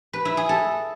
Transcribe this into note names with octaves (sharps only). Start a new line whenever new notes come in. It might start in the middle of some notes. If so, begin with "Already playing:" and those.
B4
E4
G#4
A4